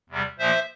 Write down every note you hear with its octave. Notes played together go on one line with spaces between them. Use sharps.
E2 C3 G3
A#2 F3 A#3 C5 E5